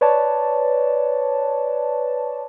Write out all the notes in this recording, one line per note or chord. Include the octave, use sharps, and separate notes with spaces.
B4 C#5 D5 A5